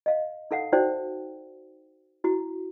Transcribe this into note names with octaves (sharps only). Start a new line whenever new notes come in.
D#5 F5
D#4 A4 F5 F#5
D#4 F#4 C5 D5 G5
E4 F#4